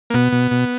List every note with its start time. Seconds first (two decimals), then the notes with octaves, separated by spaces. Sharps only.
0.10 A#3
0.14 B2 B3
0.32 B2
0.51 B2